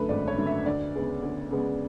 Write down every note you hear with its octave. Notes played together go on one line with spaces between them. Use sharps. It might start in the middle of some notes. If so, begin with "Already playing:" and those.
Already playing: F#2 D3 A3 A4 B4
G#1 D5
C#5
F#2 D3 A3
E5
D2 D5
C#3 G#3 B3
D2
C#3 G#3 B3